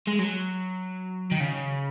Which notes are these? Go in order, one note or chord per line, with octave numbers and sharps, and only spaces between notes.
G#3
F#3
D#3
C#3